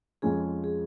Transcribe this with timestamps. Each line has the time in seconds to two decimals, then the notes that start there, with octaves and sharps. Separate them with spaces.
0.22 F2 F3 G#3 C#4 G#4
0.64 G#4